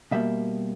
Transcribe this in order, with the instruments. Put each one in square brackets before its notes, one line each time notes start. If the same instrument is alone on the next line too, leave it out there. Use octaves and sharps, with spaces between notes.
[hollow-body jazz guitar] B2 G3 A#3 E5